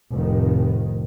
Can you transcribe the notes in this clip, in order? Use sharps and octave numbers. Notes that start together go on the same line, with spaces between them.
F1 A2 D#3